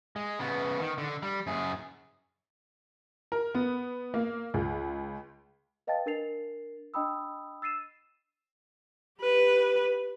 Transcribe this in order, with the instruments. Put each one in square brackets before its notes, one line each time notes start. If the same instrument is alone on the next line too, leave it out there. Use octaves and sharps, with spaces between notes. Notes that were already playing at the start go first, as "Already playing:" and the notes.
[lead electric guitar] G#3
C#3 B3
D#3
D3
G3
F#2 G#4
[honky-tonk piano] A#4
B3
A#3
C#2
[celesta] B4 D#5 F5 G5 A5 A6
D4 A#4 A6 C7 F7
D4 D#5 G5 B5 D#6 E6
E6 A6 C7 D#7 E7
[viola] G4 B4